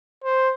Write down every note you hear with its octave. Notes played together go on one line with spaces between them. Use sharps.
C5